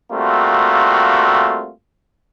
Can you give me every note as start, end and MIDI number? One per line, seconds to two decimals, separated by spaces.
0.12 1.71 55
0.12 1.71 57
0.12 1.71 58
0.12 1.71 60
0.12 1.71 65
0.12 1.71 66